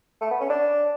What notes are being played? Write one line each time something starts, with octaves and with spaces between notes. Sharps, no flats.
A3
B3
C#4
D4